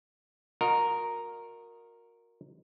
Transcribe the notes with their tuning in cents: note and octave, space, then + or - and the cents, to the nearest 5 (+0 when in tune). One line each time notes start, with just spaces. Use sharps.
F#4 -40 A#4 +0 D#5 +0